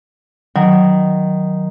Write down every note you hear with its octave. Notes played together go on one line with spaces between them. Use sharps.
D#3 F#3